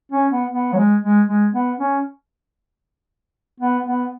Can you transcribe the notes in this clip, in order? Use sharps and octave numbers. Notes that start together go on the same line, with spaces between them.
C#4
B3
B3
F#3
G#3
G#3
G#3
B3
C#4
B3
B3